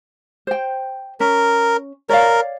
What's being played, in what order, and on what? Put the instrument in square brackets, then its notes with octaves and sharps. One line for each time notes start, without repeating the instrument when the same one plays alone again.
[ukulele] C5 G5
[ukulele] C#4 [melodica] A#4
[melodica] A#4 [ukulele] C#5 D5 F5